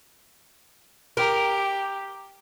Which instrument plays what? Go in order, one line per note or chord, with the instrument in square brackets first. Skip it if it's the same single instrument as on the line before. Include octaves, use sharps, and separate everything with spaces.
[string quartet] G4 [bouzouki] A#4